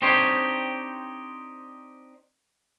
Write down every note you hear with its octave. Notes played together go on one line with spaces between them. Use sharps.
C4 D4 D#4 G4 C5 C#5